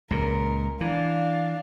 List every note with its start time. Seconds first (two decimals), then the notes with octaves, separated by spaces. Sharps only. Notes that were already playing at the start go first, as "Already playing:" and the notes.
0.11 C#2 A#2 A#4
0.81 E3 D4 F5